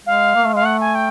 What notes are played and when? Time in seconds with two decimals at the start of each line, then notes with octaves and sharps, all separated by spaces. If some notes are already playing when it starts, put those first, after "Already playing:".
0.05 G#3 F5
0.35 A#3
0.44 A3
0.53 G#3 F5
0.63 A3 F#5
0.80 G#5
0.95 G5